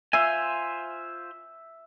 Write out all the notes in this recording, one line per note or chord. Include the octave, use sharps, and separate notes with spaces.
F4 C5 E5 G#5